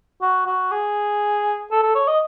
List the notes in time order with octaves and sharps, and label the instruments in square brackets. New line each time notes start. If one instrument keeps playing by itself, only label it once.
[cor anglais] F#4
F#4
G#4
A4
A4
C#5
D#5